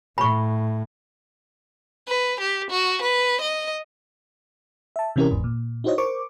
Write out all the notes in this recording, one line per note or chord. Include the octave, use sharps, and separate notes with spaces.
A2 B5 C#6
B4
G4
F#4
B4
D#5
E5 A5
C3 E3 C#4 E4 G4 A#4
G1 E2 G#2
A#2
D#4 E4 F#4 C5 C#5 D#5
A#4 C5 C#6 D6